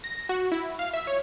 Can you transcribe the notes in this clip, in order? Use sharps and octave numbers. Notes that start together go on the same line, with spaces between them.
A#6
F#4
E4
F5
E5
C#5